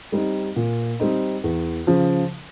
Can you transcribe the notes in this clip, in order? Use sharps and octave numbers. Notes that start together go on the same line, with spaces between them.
G3 C4 D#4
A#2
G3 C4 D#4
E2
C#3 F3